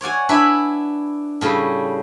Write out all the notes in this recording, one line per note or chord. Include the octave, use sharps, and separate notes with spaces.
C#5 D5 F#5 G#5
D4 E4 B4 G#5 B5
A2 C#3 G3